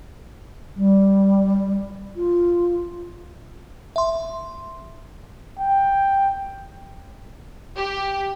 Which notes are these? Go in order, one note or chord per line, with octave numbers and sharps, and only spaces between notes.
G3
F4
E5 C6
G5
G4